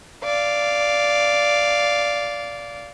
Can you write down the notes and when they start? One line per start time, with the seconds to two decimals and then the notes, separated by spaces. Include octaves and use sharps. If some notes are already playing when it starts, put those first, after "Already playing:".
0.24 D5 F5